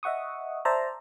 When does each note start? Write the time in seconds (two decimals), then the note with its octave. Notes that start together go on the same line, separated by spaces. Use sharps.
0.03 D#5 E5 F#5 C#6 D#6
0.65 C5 D5 E5 A5 A#5